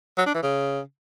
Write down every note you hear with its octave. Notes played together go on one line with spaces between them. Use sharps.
F#3
D4
E3
C#3